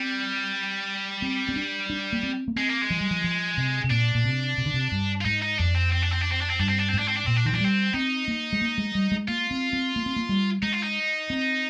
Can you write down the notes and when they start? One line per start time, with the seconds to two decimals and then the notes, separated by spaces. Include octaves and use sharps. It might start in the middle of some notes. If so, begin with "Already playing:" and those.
Already playing: G3 C4
1.22 C4
1.49 C4
1.56 D4
1.90 D4
2.13 A#3
2.23 C4
2.48 A#3
2.56 G#3 C4
2.69 A#3
2.82 G#3
2.90 F3
3.01 G3
3.11 F3
3.24 F3
3.57 C3
3.84 C3
3.91 A#2 D4
4.15 A#2
4.25 C3
4.58 C3
4.66 D3
4.74 C3
4.92 G2
5.21 F4
5.25 G#2 D#4
5.42 D#4
5.58 F2 D4
5.75 C4
5.93 C4
6.03 D4
6.12 C4
6.21 D4
6.32 C4
6.41 D4
6.50 C4
6.59 G2 D4
6.69 C4
6.78 D4
6.88 C4
6.93 G#2
6.99 D4
7.08 C4
7.17 D4
7.26 A#2 C4
7.36 D4
7.45 D#3 C4
7.53 F3 D4
7.60 G3 C4
7.94 C4 D#4
8.28 A#3
8.53 G#3
8.62 A#3
8.78 G#3
8.95 G3
9.12 G#3
9.28 A#3 F4
9.51 C4
9.73 C4
9.96 A#3
10.06 C4
10.16 A#3
10.29 G3
10.62 G#3 D#4
10.74 F4
10.84 D#4
11.30 C4